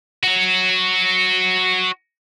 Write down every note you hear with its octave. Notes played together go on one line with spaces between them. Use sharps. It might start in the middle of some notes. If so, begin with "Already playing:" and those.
F#4 C#5